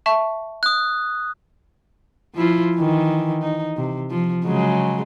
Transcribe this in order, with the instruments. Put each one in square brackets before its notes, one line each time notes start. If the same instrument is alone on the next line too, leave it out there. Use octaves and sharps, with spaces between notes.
[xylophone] E5 A5 C#6
[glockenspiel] D#6 F#6
[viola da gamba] F3 E4 F4
D#3 E3
D#4
C3
F3
C#3 F#3 G#3